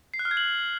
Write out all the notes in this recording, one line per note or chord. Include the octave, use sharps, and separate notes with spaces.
C7
F#6
F6
G#6
F#7